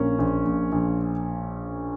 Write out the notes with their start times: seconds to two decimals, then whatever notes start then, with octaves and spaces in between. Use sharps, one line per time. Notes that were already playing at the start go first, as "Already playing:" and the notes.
Already playing: A#1 A#2 A#3 C#4
0.19 A#1
0.45 A#1
0.72 A#1